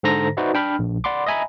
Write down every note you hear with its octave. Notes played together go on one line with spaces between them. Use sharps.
G#2 D3 A4 C5 A#5 A#6
D#4 F#4 B4 C5 D5 E5
D4 G5 B5 F6
A#1
D5 F#5 B5 C6 D6
D#5 E5 G#5 A#5 B5